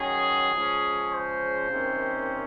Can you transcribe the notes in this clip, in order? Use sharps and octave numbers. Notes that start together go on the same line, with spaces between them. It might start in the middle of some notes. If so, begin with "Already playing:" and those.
Already playing: D#3 F#3 C#4 G#4
C#3 F3 G#3 C#4
C5
C3 D#3 A#3 C#4